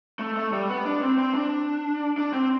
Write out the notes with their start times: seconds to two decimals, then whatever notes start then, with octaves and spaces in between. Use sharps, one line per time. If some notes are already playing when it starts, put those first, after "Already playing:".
0.19 A3
0.37 A3
0.52 G3
0.69 B3
0.85 D4
1.03 C4
1.18 C4
1.35 D4
2.18 D4
2.33 C4